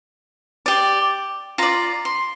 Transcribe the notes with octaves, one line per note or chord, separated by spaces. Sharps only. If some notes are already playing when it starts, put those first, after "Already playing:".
G4 D5
F4 D5 A#5
C6